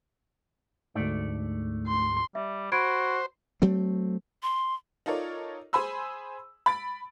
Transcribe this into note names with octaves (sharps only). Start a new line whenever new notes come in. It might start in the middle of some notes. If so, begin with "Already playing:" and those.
D2 G#2 A3 D5
C6
G3 E5
F#4 C5 B5 G#6 D7
F#3 A3 C4
C6
D#4 F4 A4 A#4 C#5 D5
G#4 C5 G#5 B5 C6 E6
B5 A6 D7